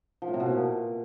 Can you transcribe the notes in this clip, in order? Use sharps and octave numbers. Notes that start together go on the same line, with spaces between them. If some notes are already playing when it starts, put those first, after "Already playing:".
F3
A2
C3
B2
A#2